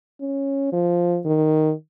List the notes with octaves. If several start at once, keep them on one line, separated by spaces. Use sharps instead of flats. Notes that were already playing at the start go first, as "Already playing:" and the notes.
C#4
F3
D#3